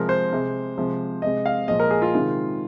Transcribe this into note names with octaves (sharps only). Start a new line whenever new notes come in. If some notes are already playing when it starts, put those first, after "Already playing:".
Already playing: C3 F3 G#3 A#4
C5
C3 G#3
C3 F3 G#3
C3 G#3 D#5
F5
A#2 F3 G#3 D#5
A#4
G#4
F4
C3 D#3 G#3